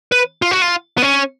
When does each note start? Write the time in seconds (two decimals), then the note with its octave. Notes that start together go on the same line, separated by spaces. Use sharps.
0.12 B4
0.42 F4
0.51 F#4
0.62 F4
0.97 B3
1.02 C#4